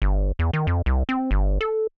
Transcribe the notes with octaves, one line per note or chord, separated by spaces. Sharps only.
G1
E2
D#3
F2
C2
C4
G1
A4